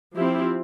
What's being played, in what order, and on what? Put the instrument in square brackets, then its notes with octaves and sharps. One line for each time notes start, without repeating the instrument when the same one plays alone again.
[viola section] F3 C4 E4 G4